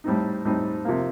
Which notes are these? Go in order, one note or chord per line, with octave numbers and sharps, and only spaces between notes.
A2 G3 C4 D#4
A2 G3 C4 D#4
C3 F3 A#3